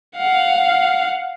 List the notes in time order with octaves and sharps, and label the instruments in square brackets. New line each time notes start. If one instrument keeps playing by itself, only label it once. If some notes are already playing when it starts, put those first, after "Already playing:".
[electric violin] F5 F#5